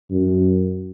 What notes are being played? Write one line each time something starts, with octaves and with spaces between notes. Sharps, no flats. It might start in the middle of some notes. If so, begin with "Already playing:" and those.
F#2